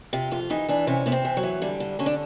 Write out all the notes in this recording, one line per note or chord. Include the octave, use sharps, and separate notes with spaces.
C3 F4
F2 F4
E3 D#4
E3 D4
C3 C#4
C3 B3
C4
E3
F#3
E3
D3 G3
D3
D3 C#4
D4